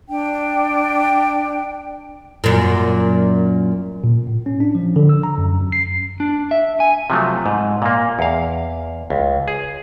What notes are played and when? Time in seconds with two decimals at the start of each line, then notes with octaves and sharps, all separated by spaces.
0.08 D4 G5
2.44 F#2 A#2
4.04 A#2
4.27 A2
4.46 C#4
4.60 D4
4.75 F3
4.96 D3
5.09 E6
5.23 A#5
5.38 F#2
5.60 F#2
5.72 C7
6.20 D4
6.51 E5
6.80 G#5
7.10 C3 F3 F#3 A3
7.46 G#2
7.82 A#2 A#3
8.19 E2 F5
9.10 C#2
9.48 G#4